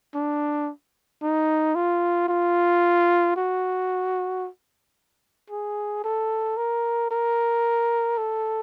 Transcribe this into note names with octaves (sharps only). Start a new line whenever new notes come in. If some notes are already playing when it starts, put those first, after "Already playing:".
D4
D#4
F4
F4
F#4
G#4
A4
A#4
A#4
A4